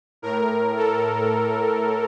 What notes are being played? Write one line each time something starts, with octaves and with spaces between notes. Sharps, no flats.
A2 A#4
A4